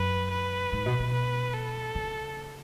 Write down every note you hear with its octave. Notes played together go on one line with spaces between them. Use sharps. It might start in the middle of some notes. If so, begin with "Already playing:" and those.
Already playing: F#2 B4
B4
G#2
B2
B2
B4
A4
C#3